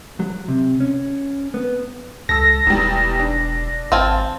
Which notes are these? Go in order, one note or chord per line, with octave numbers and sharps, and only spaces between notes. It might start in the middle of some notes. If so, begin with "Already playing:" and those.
F#3
C3
C#4
B3
C#2 A4 E6 A#6
E1 E2 G3
D4
G#1 C4 F5 G#5 A5